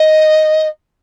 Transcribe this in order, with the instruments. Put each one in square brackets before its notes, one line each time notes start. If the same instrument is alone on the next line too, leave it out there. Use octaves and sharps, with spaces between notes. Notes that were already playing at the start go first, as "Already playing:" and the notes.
Already playing: [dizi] D#5